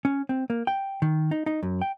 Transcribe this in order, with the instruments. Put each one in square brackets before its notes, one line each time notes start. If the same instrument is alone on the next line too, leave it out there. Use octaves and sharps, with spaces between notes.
[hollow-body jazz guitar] C#4
C4
A#3
G5
D#3
D#4
D#4
F#2
G5